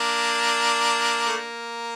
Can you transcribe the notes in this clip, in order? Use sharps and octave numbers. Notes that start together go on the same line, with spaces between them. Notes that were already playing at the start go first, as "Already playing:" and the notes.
Already playing: A#3 D4
A3
A#3